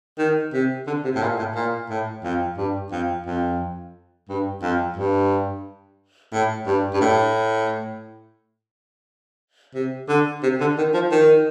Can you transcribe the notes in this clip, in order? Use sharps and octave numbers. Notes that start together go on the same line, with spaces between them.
D#3
C3
D3
C3
A2
A#2
A2
A#2
A2
F2
G2
F2
F2
G2
F2
G2
A2
G2
G2
A2
C3
D3
C3
D3
D#3
F3
D#3